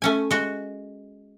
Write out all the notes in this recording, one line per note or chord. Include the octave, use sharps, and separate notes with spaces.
A3 C#4 G#5
G#3 F#4